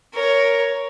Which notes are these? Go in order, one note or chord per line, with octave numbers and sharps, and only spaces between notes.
A#4 C#5